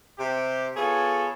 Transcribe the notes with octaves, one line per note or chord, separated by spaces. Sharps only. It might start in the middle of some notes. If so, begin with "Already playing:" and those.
C3 G4
B3 F4 G#4 A4 C#5